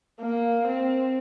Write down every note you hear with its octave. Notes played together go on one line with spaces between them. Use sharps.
A#3
C4